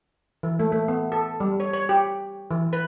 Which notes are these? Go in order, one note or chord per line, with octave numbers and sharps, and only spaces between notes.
E3
A3
A3
B3
A4
G3
C#5
C#5
G4
E3
B4